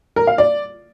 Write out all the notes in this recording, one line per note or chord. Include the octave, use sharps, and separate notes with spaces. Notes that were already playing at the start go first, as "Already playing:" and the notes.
A#4
F5
D5